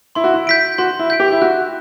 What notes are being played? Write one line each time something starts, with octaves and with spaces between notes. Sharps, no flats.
E4 C6
F#4
E4
G6 B6 D7
F#4 C6
E4
G6 B6 D7
G4
E4
F#4 F#6